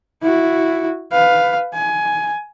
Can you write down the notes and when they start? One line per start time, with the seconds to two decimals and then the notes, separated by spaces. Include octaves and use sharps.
0.22 E4 F#4
1.12 B4 F5
1.74 G#5